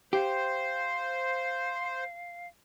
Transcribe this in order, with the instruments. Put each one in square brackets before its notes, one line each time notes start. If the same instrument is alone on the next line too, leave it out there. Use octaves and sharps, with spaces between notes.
[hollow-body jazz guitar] G4 [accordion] C5 [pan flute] F5